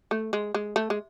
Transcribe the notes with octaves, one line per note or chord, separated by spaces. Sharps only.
A3
G#3
G#3
A3
G#3